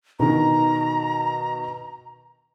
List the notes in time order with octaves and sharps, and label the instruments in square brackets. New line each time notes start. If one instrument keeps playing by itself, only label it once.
[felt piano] B2 D#3 [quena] A#5